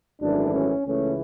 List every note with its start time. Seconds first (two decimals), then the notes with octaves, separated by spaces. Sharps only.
0.21 G#1 F#2 E3 A3 D4
0.54 C#4
0.86 C#2 C#3 E3 A3 C#4